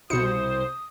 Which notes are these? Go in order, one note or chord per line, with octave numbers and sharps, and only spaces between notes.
C2 B2 C5 D#6 C#7